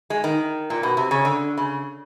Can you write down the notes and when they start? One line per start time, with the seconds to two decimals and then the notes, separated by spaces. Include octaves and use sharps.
0.10 G#3
0.24 D#3
0.70 A#2
0.83 B2
0.97 C3
1.11 C#3
1.25 D3
1.57 C#3